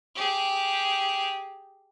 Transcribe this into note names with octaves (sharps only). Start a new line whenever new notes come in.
G4 G#4